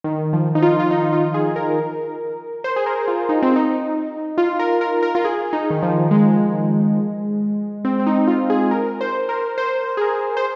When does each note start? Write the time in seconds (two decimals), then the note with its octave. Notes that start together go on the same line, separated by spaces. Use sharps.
0.04 D#3
0.33 F3
0.55 D#4
0.62 F4
0.80 F4
0.91 D#4
1.13 F4
1.34 G#4
1.56 A#4
2.64 C5
2.76 G#4
2.86 A#4
3.08 F4
3.29 D#4
3.42 C4
3.56 D#4
4.38 F4
4.59 A#4
4.81 A#4
5.03 A#4
5.15 F4
5.24 G#4
5.53 D#4
5.70 D#3
5.82 F3
6.11 G#3
7.85 C4
8.00 C4
8.06 D#4
8.27 F4
8.50 G#4
8.71 A#4
9.01 C5
9.29 A#4
9.58 C5
9.97 G#4
10.01 A#4
10.37 C5